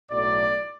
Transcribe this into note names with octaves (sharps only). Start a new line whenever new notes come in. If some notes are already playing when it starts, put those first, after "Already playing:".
B1 A2 F#3 A3 D5